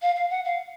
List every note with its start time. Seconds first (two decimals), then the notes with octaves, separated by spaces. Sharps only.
0.02 F5
0.15 F5
0.30 F#5
0.45 F5